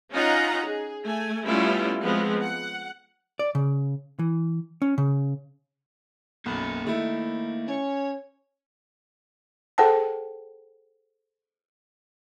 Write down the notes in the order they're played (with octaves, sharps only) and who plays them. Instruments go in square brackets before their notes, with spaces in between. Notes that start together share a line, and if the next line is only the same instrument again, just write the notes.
[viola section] C#4 D#4 F4 D#5 F#5 A#5
G#4
A3 G#5
G3 A3 B3 C#4 E4 F4
F3 G#3 B3 C4
F#5
[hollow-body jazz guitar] D5
C#3
E3
C#4
C#3
[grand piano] B1 F#2 [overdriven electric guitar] A#3 B5
[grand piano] D#3 A3 E4
[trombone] C#4 [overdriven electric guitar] C#5
[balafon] G#4 A4 C5 F#5 G5 A5